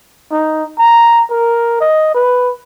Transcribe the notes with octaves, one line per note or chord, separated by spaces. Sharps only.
D#4
A#5
A#4
D#5
B4